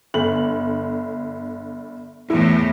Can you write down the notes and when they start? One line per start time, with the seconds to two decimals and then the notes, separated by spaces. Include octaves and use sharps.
0.14 G1 D3 F#7
2.30 E2 A2 E4